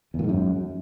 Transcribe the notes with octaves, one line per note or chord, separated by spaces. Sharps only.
E2
A#2
G#2
F#2